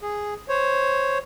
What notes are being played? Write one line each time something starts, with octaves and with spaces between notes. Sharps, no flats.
G#4
C5 C#5